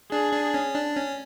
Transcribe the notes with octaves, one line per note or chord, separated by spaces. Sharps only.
D4 G#4
D4
C#4
D4
C#4